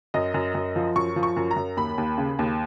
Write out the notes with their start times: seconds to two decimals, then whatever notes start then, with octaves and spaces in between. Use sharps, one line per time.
0.14 F#2 D#5
0.34 F#2
0.55 F#2
0.76 F3
0.96 F#2 C#6
1.16 F3
1.23 C#6
1.37 F#2
1.51 A#5
1.56 F#2
1.77 D#2 B5
1.98 D#2
2.18 C#3
2.39 D#2